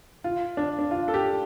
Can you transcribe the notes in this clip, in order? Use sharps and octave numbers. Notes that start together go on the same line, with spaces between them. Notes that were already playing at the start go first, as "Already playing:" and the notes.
F4
D4
D4
F4
A4
G4